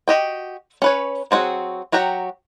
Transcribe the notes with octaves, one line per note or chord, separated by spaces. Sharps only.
F#4 G4 D#5 G5
C#4 B4 C#5
F#3 C4 D4 F#4 G#4
F#3 F#4 G4 G5 A#5